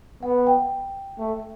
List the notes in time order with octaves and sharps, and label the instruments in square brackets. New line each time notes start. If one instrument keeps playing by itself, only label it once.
[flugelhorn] B3 [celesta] F#5
[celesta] G5
[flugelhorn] A3